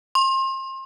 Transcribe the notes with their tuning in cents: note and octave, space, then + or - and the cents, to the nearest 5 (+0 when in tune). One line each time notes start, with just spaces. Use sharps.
C6 +30